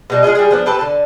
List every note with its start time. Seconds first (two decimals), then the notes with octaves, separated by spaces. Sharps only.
0.10 B2 G3 D#4
0.23 G#3 F4 G#4 D#5
0.35 G3 G#4
0.51 F3 B3 D4
0.66 C4 G4 A4 B4
0.79 D3 A5